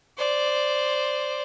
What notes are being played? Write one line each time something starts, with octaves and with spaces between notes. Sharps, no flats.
C5 D5